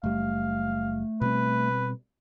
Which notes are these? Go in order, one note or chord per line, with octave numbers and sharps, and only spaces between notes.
F#1 G3 A3 F5
B2 G3 C4 B4